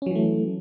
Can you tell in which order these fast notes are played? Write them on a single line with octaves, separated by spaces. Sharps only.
C#4 F#3 E3 A3